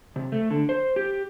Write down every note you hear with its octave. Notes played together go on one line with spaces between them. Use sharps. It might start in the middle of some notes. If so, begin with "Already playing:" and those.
C3
A3
D3
C5
G4